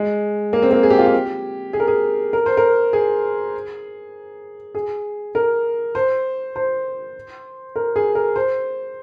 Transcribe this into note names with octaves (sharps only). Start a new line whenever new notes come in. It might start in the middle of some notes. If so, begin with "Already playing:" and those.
Already playing: G#3
A#3
C4
A#3
G#4
G4
F4
G4
G#4
A#4
G#4
A#4
C5
A#4
G#4
G#4
A#4
C5
C5
A#4
G#4
A#4
C5